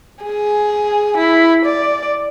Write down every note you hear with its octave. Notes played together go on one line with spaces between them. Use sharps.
G#4
E4
D5